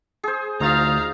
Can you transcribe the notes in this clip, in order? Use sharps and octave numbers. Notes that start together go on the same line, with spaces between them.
G#4 C5
D2 D#4 F4 F5 A#5 A6